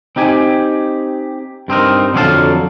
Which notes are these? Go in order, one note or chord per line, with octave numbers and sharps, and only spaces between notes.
C4 D#4 G4 G#5
G2 C4 D#4 A#4
F2 D3 F#3 C#4 F5 A5